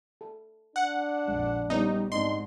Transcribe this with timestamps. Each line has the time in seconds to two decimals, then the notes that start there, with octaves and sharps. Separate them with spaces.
0.21 A4
0.76 D4 F#5
1.28 A#1 F2 G#3
1.70 G3 A#3 B3 C#4 D#4
2.12 G#2 C4 D4 D#4 D#5 C6